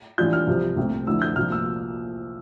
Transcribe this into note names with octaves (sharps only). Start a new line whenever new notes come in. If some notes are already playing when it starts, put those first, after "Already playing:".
A2 E3 G3 D4 F4 G6
F6
C2 C3 F3
C2 A#2 A3 C4
F2 D3 A3 E4 E6
G6
C2 A#2 F3 A#3 F4 F6
E6